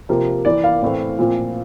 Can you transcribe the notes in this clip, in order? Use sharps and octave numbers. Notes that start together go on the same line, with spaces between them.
C3 F3 A#3
E3 A#3 D5
F5
A2 E3 A3 C4
A#2 F3 C4